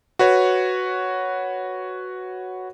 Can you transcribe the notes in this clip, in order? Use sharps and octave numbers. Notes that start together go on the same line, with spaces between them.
F#4 B4 C#5